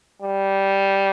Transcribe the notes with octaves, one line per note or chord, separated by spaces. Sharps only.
G3